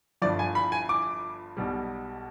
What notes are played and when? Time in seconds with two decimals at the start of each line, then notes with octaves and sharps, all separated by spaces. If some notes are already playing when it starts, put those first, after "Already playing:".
0.22 G1 G2 F3 D5
0.39 G#5
0.55 B5
0.72 G#5
0.89 D6
1.57 B1 B2 G3